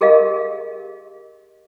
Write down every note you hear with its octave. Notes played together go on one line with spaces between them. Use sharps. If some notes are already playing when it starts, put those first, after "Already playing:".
G4 G#4 A#4 D#5 F5